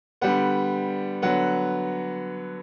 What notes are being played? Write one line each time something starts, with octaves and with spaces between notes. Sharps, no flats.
D3 G3 B3 F#5
D3 F#3 B3 F#5